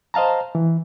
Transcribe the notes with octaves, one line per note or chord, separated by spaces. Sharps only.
C5 D#5 F5 A5 A#5
E3